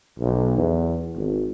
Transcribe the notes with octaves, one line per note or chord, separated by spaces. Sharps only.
B1
E2
G#1